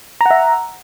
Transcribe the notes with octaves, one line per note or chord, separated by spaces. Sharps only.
E5 F#5 A#5